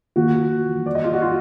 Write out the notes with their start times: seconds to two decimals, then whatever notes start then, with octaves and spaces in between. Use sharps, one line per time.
0.16 D#3 A#3 F4 F#4
0.86 D5
0.95 D#5
1.04 F4
1.13 F#4
1.22 F4